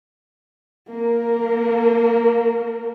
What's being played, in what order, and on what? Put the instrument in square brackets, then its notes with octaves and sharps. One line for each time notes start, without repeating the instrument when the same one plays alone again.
[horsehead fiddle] A#3 A#4